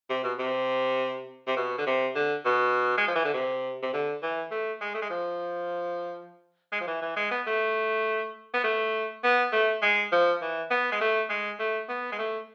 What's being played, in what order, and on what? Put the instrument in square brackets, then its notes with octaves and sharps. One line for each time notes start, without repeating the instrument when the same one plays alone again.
[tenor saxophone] C3
B2
C3
C3
B2
D3
C3
D3
B2
G#3
F3
E3
D3
C3
C3
D3
E3
A3
G#3
A3
G#3
F3
G#3
F3
E3
E3
G#3
B3
A3
B3
A3
B3
A3
G#3
F3
E3
B3
G#3
A3
G#3
A3
B3
G#3
A3